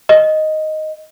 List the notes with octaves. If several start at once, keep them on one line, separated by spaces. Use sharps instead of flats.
D#5